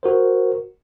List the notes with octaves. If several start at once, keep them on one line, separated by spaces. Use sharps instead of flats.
F#4 A#4 C5